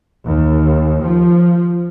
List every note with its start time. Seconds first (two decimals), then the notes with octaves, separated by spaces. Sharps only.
0.24 D#2
1.01 F3